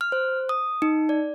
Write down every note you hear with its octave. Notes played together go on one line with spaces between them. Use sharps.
F6
C5
D#6
D#4
D5